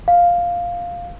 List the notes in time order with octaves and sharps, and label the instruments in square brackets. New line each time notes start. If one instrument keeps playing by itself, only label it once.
[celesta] F5